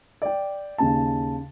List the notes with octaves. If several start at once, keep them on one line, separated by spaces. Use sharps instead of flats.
D5 G5
D#2 C#3 A5